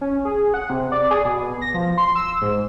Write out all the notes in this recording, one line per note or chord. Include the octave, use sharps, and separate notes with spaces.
C#4
G#4
F#5
C3
D5
G#4
B2
A#6
F3
C6
E6
G#2